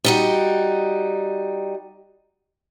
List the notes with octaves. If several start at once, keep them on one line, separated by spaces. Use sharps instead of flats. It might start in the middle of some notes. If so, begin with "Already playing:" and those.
G3 D#4 F#4